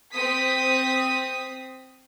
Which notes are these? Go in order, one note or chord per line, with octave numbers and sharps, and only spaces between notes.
C4 D#6 B6